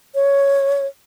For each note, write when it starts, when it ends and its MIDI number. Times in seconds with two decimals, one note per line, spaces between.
0.15 0.86 73